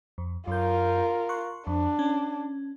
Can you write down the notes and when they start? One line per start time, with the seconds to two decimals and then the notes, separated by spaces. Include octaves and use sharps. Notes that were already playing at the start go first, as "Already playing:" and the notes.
0.18 F2
0.47 F#2 F4 A#4 G6
1.29 C6 C#6 F#6
1.67 F2 D4
1.99 C#4